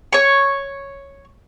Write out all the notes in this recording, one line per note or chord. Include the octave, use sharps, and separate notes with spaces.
C#5 C#6